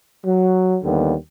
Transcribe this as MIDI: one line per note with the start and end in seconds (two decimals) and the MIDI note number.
0.25 0.77 54
0.83 1.14 39
0.83 1.14 50
0.83 1.14 55
0.83 1.14 59